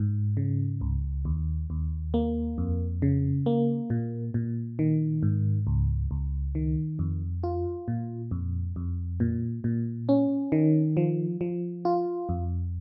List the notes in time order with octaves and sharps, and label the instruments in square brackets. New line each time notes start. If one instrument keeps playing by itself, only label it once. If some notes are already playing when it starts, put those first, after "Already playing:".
Already playing: [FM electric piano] G#2
C#3
C#2
D#2
D#2
A#3
F2
C#3
A#3
A#2
A#2
D#3
G#2
C#2
C#2
D#3
F2
F4
A#2
F2
F2
A#2
A#2
C#4
D#3
F3
F3
F4
F2